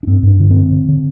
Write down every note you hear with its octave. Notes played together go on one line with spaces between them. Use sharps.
D4
G2 C4
G2
D4
D3
C4
D3
D3
D3